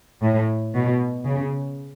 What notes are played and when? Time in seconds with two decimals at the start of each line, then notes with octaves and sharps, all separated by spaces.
0.23 A2
0.75 B2
1.26 C#3